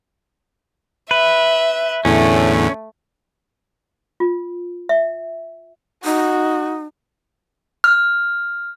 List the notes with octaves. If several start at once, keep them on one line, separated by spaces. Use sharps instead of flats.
B4 E5
E2 A2 D3 A3 C#4
F4
E5
D#4 F#4
F6